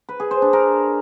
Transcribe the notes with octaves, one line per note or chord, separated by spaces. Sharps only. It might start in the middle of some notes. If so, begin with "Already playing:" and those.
B4
G#4
C5
D4
A#4